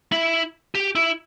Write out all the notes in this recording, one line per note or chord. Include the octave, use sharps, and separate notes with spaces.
E4
G4
E4